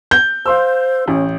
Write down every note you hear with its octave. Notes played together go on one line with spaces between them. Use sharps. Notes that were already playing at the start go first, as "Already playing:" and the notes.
G6
C5 F5 C6 E6
A1 C#4